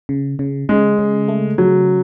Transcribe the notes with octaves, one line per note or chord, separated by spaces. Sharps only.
C#3
C#3
C#3 G#3
C#3
A3
C#3 F#3